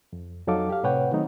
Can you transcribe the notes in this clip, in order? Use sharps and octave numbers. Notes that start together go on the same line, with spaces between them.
F2
F2 F#3 D#4 A4 F5 D6
G4 F5
A2 C3 B4 C#5 F#5 G5
D#3 F#3 A3 C4 D#4